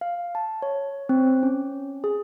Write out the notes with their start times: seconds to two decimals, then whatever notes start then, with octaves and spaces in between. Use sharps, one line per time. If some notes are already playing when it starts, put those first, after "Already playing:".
0.01 F5
0.35 A5
0.62 C#5
1.09 C4
1.43 C#4
2.04 G#4